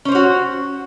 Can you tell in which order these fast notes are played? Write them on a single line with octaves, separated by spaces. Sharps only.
C#4 C5 C#5 F#4